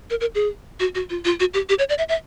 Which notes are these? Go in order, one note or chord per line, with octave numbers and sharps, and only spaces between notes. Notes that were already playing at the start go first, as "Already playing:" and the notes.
A#4
A#4
G#4
F#4
F#4
F4
F4
F#4
G4
G4
C#5
D5
E5
E5